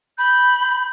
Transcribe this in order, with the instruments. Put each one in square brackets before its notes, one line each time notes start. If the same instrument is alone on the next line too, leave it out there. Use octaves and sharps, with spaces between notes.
[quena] B5 [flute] G6